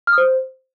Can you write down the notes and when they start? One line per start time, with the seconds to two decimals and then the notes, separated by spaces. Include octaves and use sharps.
0.07 F6
0.13 D#6
0.18 C5